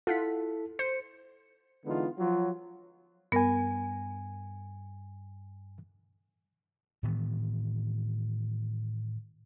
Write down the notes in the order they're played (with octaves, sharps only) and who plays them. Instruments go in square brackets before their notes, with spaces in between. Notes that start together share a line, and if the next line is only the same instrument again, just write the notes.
[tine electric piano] E4 A4 [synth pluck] F4 F#5 B6
[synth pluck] C5 [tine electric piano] C#7
[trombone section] D3 E3 G#3 B3 D#4 F4
F3 F#3 F4
[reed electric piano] G2 G#5 [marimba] B3 A#4
[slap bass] A2 D#3 E3 B3